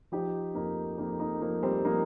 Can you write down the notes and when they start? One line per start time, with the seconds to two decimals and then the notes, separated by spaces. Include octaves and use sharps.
0.12 F3 D#4 G4
0.55 F2 A#3 D#4
0.98 F2 A#3 D#4
1.20 A#3 D#4
1.41 F3 A#3
1.63 G3 C4
1.85 F3 A#3 D#4